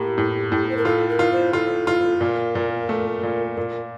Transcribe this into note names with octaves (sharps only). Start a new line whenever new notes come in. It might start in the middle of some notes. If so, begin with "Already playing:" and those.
Already playing: A2 A#3 G4
A2
A2
C5
A#4
F4 A4
A#4
F4
C5
F4 A4
F4
A#2 A#4
A#2
A3
A#2
A#2